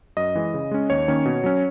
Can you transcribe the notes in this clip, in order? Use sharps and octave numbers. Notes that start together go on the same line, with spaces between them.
F#2 D#5
E3 G#3
C#3
G#3 C#4
D#2 C#5
D#3 A#3 C#4
B2
F#3 C#4